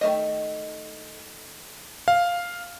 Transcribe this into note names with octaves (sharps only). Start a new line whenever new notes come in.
D#3 A3 D#5
F5